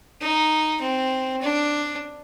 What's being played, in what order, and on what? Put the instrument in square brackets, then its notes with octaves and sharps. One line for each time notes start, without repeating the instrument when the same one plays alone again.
[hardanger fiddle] D#4
C4
D4